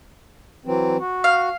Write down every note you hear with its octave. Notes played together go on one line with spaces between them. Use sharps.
E3 F#3 C4
F#4
F5